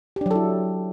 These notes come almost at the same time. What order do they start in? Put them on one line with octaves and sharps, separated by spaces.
G4 D4 F#3 A4 E4